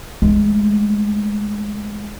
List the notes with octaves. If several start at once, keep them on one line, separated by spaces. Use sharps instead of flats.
G#3 A3